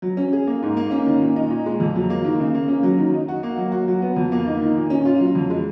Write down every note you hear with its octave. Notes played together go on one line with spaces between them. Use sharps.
F#3
C#4
G#4
A#3
G#2
A#3
C#4
D#3
A#2
D#4
A#2
G#3
F2
F#3
A#3
D#3
C#3
A#3
C#4
F#3
D#3
D#4
F#4
A#3
F#3
F#4
F#3
B3
F2
A#3
D#4
D#3
A#2
C#4
F4
F#3
F2
G#3